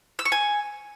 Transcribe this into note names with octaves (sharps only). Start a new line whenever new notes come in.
E6
C#6
G#5